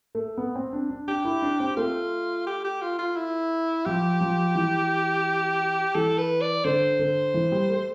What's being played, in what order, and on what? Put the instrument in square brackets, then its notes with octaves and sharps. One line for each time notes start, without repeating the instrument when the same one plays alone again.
[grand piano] A3
B3
C4
D4
D4
[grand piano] D4 [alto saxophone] G4
[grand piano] E4
D4
C4
[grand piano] A3 [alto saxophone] F4
[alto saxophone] G4
G4
F4
F4
E4
[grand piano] F3 [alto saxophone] G4
[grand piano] F3
E3
[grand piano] E3 [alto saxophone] A4
[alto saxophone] B4
D5
[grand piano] D3 [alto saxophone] C5
[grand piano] D3
E3
G3
A3